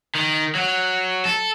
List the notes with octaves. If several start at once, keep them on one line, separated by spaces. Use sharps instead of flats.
D#3
F#3
A4